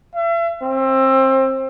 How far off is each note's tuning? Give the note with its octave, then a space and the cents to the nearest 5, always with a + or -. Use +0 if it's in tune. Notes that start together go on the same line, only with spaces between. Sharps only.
E5 +40
C4 +25